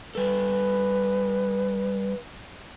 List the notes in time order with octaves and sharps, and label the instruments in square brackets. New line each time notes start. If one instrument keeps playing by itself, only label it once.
[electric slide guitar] G3 A4 [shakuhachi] B4